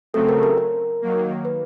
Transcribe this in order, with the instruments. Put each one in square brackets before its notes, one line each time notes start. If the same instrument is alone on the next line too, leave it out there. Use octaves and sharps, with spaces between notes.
[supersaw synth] C#3 F#3 A3 C4 [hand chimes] A4
[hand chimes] A#4
A#4
A#4
[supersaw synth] D#3 F#3 A#3
[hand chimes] B4